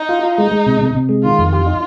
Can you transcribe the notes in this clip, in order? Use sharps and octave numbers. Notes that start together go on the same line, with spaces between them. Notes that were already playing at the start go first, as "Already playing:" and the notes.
Already playing: D#4
F4
F4
G#3 D#4
G#3
C3
C3
C3
G#3
D#3 F4
F2
F4 G4
D#4